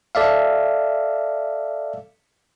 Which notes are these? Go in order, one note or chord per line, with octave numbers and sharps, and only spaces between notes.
A4 D5 E5 F5